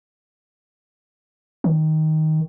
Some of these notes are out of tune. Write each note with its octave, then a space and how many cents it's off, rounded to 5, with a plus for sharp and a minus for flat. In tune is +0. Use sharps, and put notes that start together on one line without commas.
D#3 +10